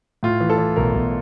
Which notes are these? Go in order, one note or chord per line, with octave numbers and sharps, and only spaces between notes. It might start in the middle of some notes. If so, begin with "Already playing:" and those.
A2 F4
E3
A4
E3
B1 A#4
B1